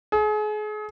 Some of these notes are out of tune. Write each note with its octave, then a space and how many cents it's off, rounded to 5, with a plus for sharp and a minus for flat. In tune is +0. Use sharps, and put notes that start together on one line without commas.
G#4 +35